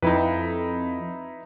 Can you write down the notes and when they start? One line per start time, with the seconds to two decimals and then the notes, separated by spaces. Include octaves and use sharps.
0.02 F2 D#4 E4 B4